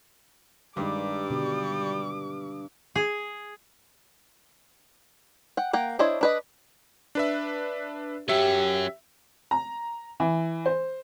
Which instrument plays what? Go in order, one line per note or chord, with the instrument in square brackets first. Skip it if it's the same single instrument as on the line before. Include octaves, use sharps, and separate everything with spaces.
[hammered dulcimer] G2 [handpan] D#3 G#3 D#4 [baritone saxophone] G3 [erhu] D6
[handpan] B2 D3 D4
[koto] G#4
[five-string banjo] F#5 G5
A#3 F#5 G5
D4 E4 C5 C#5 D#5
D4 B4 D#5
[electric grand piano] D4 B4 E5
[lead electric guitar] F#3 C#4 [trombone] G4 [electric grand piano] E5
[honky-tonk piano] A#5
E3
C5